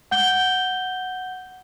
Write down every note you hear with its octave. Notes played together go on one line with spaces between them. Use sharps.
F#5 G6 G7